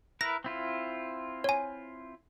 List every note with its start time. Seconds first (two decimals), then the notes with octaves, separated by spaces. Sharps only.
0.21 E4 A#4 B4 A#6
0.44 C4 E4 F4
1.44 C#5 G#5